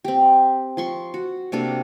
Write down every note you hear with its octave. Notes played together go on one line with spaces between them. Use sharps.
C4 G4
F3 C6 C#6
F#4
C3 A#3 D4 A4